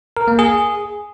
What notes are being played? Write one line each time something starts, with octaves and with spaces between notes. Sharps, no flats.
A#4
A#3
G#4